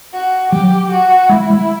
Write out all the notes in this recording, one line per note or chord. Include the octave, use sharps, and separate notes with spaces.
F#4
F#3 G4
F#4
G#3 E4
G#3